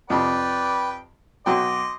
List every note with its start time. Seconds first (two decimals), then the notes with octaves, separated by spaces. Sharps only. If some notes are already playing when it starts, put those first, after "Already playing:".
0.10 F2 C3 B4 D5 G5
1.46 B1 F#3 D#5 G5 C6 D6